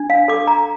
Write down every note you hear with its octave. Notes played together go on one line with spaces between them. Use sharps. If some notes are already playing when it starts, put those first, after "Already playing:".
Already playing: D4
F5
A4 D6
A#5